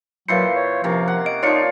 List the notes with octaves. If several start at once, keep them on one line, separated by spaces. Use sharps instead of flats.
A#2 E3 F#3 C5 F5 C#7
C#5
C3 F3 A#3 C#4
F#5
D#5 D7
F3 D#4 F4 C#5 D5 C#7